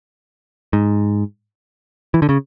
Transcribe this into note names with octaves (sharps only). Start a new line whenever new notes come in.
G#2
E3
D3
C#3